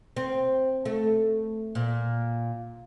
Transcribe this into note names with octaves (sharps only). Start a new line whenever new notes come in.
C4
A3
A#2